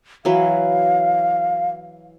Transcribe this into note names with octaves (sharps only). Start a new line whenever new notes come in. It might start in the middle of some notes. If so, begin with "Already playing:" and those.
E3 F#3 B4 F5